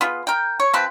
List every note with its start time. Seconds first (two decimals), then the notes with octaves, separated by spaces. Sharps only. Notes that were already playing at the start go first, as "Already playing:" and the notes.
0.01 B3 F4 G#4
0.27 A#4 G5
0.60 C#5
0.73 F3 C4 B4